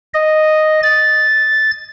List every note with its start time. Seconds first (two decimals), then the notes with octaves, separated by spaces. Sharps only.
0.14 D#5
0.83 A6